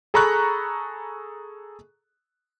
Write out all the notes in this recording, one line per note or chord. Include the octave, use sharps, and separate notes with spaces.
G#4 A4 A#5 B5 C#6 F#6